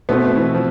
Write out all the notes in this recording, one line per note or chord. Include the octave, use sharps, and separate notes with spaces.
B2 A3 B3 C4
E3
F3